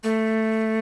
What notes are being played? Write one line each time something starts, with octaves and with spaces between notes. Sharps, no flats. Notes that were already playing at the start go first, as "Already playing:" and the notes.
A3